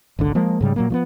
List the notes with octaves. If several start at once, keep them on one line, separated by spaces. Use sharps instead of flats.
G#1 C#2 D3
F3 G#3 A#3
G#2 C#3 G3 G#3
A#2 F#3 A#3
F3 A3 B3